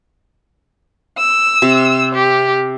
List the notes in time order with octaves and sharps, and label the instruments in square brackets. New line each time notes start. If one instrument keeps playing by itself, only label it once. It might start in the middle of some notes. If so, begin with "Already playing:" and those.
[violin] E6
[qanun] C3
[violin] G4